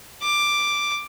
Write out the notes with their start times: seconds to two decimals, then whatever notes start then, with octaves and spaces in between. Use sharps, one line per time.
0.23 D6